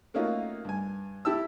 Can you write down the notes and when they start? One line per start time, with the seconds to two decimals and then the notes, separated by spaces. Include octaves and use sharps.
0.14 A3 A#3 C#4 D#4 F4 F#4
0.65 G2 G#5
1.25 E4 G4 A5 E6